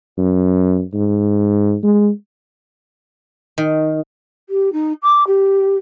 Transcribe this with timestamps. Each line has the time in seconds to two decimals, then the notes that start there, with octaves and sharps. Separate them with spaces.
0.18 F#2
0.94 G#2
1.83 G#3
3.58 D#3
4.49 G4
4.73 D#4
5.03 D6
5.27 G4